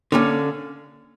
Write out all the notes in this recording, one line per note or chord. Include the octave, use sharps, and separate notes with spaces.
D3 A#3 C#4